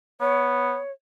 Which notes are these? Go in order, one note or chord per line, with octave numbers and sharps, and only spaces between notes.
B3 C#5